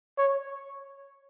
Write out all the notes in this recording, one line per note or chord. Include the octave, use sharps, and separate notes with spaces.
C#5